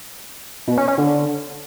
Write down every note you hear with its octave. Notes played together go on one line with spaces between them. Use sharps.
B2
C#4
C#4
D3